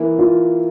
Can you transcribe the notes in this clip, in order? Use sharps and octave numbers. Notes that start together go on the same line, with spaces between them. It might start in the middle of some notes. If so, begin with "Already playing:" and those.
Already playing: E3 A#3 E4
F4